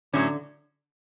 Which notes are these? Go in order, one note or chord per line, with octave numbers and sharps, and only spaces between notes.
A2 D3 F#3 C#4